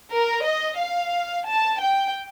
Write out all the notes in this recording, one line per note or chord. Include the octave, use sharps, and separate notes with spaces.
A#4
D#5
F5
A5
G5